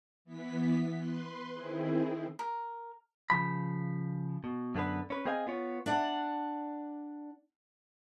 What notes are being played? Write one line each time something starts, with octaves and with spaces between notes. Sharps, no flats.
E3 B3 B6
B4 C6
D#3 C4 E4 G#4
A#4
C#3 F3 B5
B2
F#2 D3 B3 D4 B4
C#4 B4
C4 G#4 D#5 F5 G#5
B3 F4 C#5
D4 D5 F#5